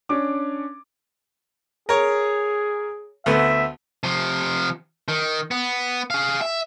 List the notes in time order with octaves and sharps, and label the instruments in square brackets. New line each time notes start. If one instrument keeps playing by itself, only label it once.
[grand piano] C#4 D4 D6
[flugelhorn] G#4 [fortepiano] A#4 C#5
[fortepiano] D2 A3 B3 [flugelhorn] E5
[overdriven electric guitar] C3 F3
D#3
B3
G#4 F5
E5